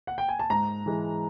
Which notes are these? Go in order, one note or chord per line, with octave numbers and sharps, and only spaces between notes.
F#5
G5
G#5
A5
G#2 A#5
E3 G#3